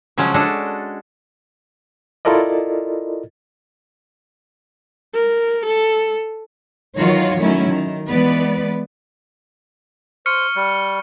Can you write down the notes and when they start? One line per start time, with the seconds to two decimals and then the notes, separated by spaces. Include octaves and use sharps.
0.18 C#3 F3 F#3 G#3 C#4
0.34 G#3 C#4 D4 F#4 A4
2.25 E4 F4 A4 A#4 D5 D#5
5.14 A#4
5.66 A4
6.98 D#3 E3 F#3 F4 F#4 C#5
7.39 D#3 F#3 A3 C#4 E4
7.68 D#3
8.07 E3 G#3 B3 B4 D5
10.26 C5 C#6 F6 C#7
10.56 G3